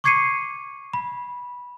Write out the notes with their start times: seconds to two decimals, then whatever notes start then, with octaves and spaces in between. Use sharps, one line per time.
0.04 C#6 D6 G#6 C7 C#7 D#7
0.93 B5